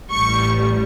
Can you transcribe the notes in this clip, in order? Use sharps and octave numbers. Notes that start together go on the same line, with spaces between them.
A1 A2 G3 C#6